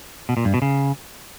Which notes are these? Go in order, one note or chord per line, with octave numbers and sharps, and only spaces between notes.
B2
A#2
G2
B2
C#3